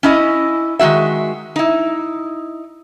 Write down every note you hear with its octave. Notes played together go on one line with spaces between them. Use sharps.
C#4 E4 D#5
D#3 G#3 B3 F#4 E5
D#4 E4